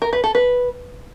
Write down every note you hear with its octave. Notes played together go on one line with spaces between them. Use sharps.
A#4
B4
A4
B4